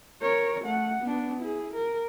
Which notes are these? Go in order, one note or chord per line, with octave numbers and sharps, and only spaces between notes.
A#4 C#5
A3 F#5
B3 D4
E4 G#4
A#4